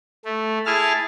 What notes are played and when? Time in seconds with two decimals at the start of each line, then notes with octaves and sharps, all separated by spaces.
0.25 A3
0.66 E4 G#4 A5 F6